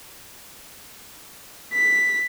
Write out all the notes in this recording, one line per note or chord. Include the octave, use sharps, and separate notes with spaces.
B6